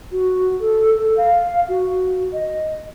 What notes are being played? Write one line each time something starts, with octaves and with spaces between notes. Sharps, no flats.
F#4
A4
A4
F5
F#4
D#5